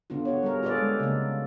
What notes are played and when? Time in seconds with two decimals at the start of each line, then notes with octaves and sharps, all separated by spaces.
0.10 D3 B3 D4 F4
0.25 F#4 C#5
0.43 G3 G#4 A#4
0.63 F4 G#4 A4 B4 D5
0.77 G#3
1.00 C#3 A#3